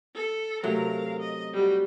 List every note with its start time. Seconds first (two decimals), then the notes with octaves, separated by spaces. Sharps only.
0.15 A4
0.63 C3 F#3 A3 A#4 F5
1.19 D#5
1.53 G3 F#4